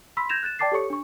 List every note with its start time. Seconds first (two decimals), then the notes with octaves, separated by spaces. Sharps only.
0.17 B5 C6 E6 B6
0.29 G6 G#6 A#6 E7 F7
0.43 F#6 A6 E7
0.59 D5 G5 A5 D6 A6 C7
0.72 G4 A4 C#5 C#6 C#7
0.90 D4 C#6